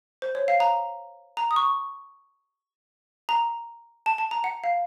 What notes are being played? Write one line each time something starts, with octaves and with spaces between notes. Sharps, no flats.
C5
C#5
F5
A#5
A#5
D#6
C#6
A#5
A5
A5
A#5
F#5
F5